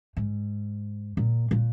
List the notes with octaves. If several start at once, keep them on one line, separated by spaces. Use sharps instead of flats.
G#2
A#2
A#2